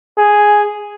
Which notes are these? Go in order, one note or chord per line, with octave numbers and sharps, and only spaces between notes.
G#4